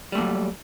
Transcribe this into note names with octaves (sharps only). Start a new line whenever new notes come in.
F#3 G3 A3 A#3